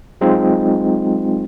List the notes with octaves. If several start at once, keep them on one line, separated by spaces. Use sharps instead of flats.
F#3 G#3 C4 D#4 F4